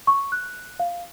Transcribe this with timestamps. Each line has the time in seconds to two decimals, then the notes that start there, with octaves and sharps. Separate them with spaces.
0.07 C#6
0.32 F#6
0.80 F5